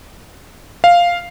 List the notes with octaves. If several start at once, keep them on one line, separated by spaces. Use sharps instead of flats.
F5